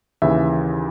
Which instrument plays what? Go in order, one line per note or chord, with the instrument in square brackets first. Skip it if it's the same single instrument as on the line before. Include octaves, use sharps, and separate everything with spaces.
[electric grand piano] D#2 C#3 E3 E5